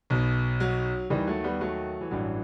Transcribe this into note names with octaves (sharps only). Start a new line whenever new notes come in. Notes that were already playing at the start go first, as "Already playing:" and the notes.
B1 B2
F#3
D#2 D#3 E3 G3
F#3 A3
G3 B3
F#3 A3
E3
A1 G2 E3 F#3